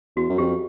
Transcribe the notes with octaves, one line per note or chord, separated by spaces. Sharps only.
E2 F#4
F#2
F2 G4